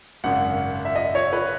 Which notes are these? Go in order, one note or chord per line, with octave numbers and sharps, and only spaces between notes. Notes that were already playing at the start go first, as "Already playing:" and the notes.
G#1 F#2 C#3 F#5
E5
D#5
C#5
B4